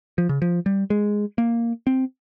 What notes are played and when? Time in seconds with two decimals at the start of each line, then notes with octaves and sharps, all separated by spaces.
0.18 F3
0.29 C#3
0.42 F3
0.66 G3
0.90 G#3
1.38 A#3
1.87 C4